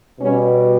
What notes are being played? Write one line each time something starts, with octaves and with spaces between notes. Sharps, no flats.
B2 G3 C#4